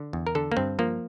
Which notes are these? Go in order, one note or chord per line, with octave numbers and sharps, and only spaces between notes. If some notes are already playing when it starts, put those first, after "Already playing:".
Already playing: D3
E2
A#4
D3 A4
A#3
G2 C4
F3 A#3